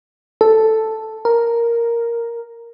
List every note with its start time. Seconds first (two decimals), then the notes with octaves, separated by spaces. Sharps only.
0.41 A4
1.25 A#4